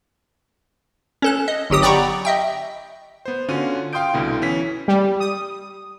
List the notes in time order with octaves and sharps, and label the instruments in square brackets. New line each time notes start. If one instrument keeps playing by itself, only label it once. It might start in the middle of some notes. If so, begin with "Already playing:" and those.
[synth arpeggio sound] C#4 A4 F#6
D#5
G1 F#3 G4 D#6
D5 F#5 G5 A#5 B5 C#6
D#5 E5 G5
[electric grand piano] B3 C5
D3 C#4 F4 F#4 D#7
F5 G5 C6 D#6 G6 D7
C2 B2 D3 E4
E3 C#4 B6
[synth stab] G3
D#6